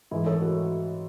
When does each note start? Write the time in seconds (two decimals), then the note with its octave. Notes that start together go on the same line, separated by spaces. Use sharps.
0.11 G#2 E3 G#3 E4
0.26 A4 C#5
0.42 F#4 A4